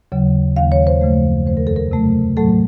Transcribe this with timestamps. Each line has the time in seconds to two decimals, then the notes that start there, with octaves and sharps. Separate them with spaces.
0.12 D#2 C#3 F#3
0.56 D#2 D#3 A#3 F5
0.72 C#5
0.87 C5
1.01 F#2 C#3 F3 A3
1.46 F2 D#3 A3 C5
1.57 A#4
1.67 A4
1.76 A#4
1.91 C3 F#3 A3
2.37 A2 F#3 A3 A4